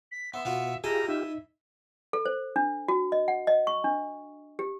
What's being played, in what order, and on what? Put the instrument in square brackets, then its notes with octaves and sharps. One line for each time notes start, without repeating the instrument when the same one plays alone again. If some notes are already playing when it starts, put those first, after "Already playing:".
[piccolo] B6
[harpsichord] B3 [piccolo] E5 [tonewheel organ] C6
[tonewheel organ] B2 [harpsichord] B3 F4 F#4
[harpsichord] E4 D#5 A5 [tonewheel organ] F4 G4 [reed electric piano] G#4 [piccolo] A#5
[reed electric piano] D#4 [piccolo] E5
[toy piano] A4
C5
D4
F#4
D#5
F#5
D#5
C#6
D4
G4